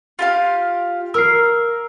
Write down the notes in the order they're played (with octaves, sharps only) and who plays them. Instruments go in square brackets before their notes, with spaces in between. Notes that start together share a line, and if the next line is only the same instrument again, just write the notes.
[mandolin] F4 G4 F5
[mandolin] A#4 [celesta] E6 F6 C7